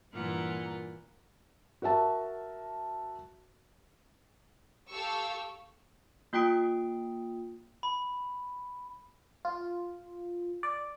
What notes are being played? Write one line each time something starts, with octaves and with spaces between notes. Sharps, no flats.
G2 A#2 E3 F4 A#4 F#5
F#4 A#4 E5 A5
G4 A4 F5 C#6 E6
A#3 F4 G5 D#6 D7
B5
F4
D5